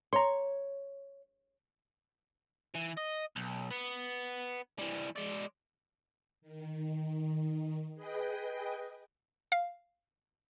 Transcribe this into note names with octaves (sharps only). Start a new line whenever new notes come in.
C#5 A#5 C6
E3
D#5
B1
B3
E3 G3
G#3 D5
D#3
G#4 B4 D#5 G5
F5